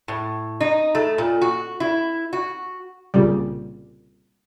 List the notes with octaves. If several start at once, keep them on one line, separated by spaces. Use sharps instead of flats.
A2
D#4
A3
A#2
F#4
E4
F#4
C2 A#2 C#3 G3